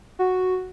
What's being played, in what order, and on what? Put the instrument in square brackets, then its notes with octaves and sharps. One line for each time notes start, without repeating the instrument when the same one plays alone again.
[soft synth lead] F#4